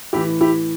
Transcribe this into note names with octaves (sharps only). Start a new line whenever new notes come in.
A2 E3 E4 G4
E4 G4